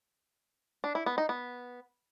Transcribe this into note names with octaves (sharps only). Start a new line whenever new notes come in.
D4
E4
B3
D#4
B3